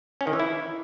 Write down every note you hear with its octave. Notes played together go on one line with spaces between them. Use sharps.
C#4
D#3
E3
E4